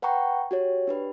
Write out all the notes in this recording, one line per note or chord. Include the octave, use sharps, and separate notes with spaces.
B4 F#5 G5 A#5 C#6
F#4 G4 C#5
D4 G4 B4